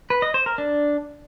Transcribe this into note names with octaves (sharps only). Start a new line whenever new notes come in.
B4
D#5
C5
A#4
D4